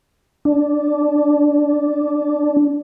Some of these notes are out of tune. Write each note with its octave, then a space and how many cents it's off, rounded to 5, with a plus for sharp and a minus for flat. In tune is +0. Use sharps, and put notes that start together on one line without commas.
D4 -10